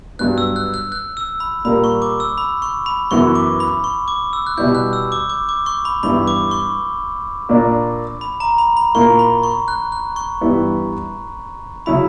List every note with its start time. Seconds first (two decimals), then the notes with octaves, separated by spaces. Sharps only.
0.19 G2 F#3 B3 F#6
0.38 E6
0.56 F#6
0.74 F#6
0.92 F#6
1.17 E6
1.40 B5
1.65 A#2 G3 A#3 B5
1.84 C#6
2.02 D6
2.20 E6
2.38 B5
2.62 C#6
2.86 B5
3.11 F#2 E3 B3 E4 C#6
3.35 D6
3.60 B5
3.84 C#6
4.08 D6
4.33 E6
4.47 F#6
4.58 B2 G3 B3 E4 G6
4.75 F#6
4.93 E6
5.12 D6
5.30 D6
5.49 D6
5.66 C#6
5.85 B5
6.03 G2 E3 B3 E4 B5
6.27 D6
6.51 C#6
7.49 A#2 A#3 D4
8.21 B5
8.40 A#5
8.58 B5
8.77 B5
8.95 A#2 A#3 E4 C#6
9.19 B5
9.43 C#6
9.68 F#6
9.92 F#6
10.16 C#6
10.41 G2 E3 G3 B3 E4
11.86 C#3 F#3 C#4 E4 B5